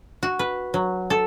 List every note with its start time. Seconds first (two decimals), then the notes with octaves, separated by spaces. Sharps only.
0.23 F#4
0.39 B4
0.74 F#3
1.10 A4